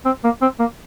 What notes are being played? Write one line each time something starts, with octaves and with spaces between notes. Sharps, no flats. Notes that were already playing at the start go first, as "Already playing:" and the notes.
C4
A#3
C4
A#3